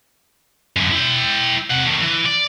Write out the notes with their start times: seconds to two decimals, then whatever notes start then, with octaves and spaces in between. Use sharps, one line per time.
0.76 F#2 D3
0.92 E4 G5
1.70 C3 F#5
1.85 D#3 A3
2.01 E3
2.26 D5